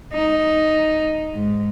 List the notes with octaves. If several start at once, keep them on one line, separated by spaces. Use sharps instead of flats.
D#4
G#2